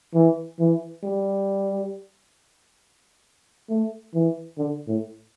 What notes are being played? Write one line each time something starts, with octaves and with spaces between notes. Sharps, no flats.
E3
E3
G3
A3
E3
D3
A2